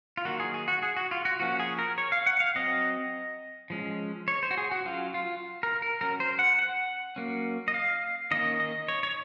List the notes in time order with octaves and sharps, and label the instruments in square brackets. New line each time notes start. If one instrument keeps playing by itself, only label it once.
[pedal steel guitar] F4
D#3 F#3 A#3 F#4
G#4
G#4
F#4
G#4
F#4
F4
F#4
F3 A#3 C#4 F#4
G#4
A#4
C#5
F5
F#5
F5
F#3 C4 D#5
F3 G#3 C#4
C#5
C5
F#4
G#4
F#4
F#3 C#4 F4
F4
A#4
A#4
F#3 C#4 A#4
C5
F#5
F#5
F#3 A#3 C#4
D#5
F5
D#3 A#3 C#4 D#5
D#5
C#5
C#5